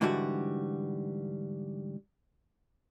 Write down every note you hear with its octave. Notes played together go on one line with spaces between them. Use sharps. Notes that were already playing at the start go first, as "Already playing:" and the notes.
G#2 D3 E3 G3 F#4